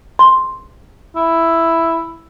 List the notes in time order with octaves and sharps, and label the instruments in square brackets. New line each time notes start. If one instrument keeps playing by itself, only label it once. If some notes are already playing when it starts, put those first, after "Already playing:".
[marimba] C6
[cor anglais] E4